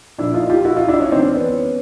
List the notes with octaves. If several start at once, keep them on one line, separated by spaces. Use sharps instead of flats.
A#2 F3 D4 E4
D#4 F4
F4 G4
E4 F#4
D#4 F4
D4 E4
C#4 D#4
G#2 E3 C4 D4
B3 C#4